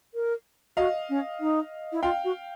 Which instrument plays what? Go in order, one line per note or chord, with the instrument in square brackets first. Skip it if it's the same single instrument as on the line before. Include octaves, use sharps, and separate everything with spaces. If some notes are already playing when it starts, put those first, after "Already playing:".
[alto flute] A#4
[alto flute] F#4 [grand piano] D#5 F5
[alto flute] C#4
D#4
E4
[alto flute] F4 [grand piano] F5 G5
[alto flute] F#4